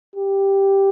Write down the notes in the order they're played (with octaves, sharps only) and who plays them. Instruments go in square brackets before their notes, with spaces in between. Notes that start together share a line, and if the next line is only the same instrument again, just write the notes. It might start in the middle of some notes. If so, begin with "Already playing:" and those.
[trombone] G4